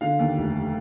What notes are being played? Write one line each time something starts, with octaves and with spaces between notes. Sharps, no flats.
D3 F5
D#2
F1